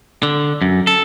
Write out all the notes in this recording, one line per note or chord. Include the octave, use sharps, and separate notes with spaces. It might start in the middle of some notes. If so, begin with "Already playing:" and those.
D3
F#2
A4